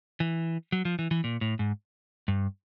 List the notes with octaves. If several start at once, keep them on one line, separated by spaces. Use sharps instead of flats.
E3
F#3
F3
E3
E3
A#2
A2
G#2
G2